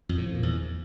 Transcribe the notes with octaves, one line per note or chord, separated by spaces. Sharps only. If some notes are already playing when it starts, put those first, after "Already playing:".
F2
A2
F3
A#2
E2